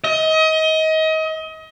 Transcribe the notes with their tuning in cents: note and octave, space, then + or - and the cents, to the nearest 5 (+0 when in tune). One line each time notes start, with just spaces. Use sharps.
D#5 +30